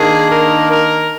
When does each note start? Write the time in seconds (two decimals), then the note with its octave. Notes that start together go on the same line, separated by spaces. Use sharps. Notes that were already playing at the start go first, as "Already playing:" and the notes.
Already playing: D#3 A#3 D4 G#4
0.30 A#4
0.69 A#4